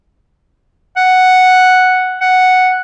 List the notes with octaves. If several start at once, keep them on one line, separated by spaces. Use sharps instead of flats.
F#5
F#5